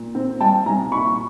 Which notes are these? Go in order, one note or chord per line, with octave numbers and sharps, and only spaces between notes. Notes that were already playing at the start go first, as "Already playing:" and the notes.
Already playing: A#2
C4
G3 G5 A5
C2 G#5 A#5
A#2 B5 C#6